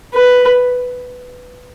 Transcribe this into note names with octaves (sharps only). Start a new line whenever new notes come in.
B4